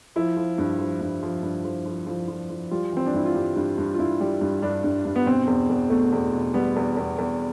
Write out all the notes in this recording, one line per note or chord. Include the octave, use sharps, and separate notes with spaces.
F3 E4
F3
G2
F3
G2
F3
G2
F3
F3
F3
F3
F3
G3 F4
E3 C4
D4
G2 E4
F4
G2 G4
G2
G2
F4
G2 E4
G3
G2
G2 D4
G2
G2
B3
B2 C4
E2
E2
B2 A3
E2
B2
G3 B3
E2
E2
E2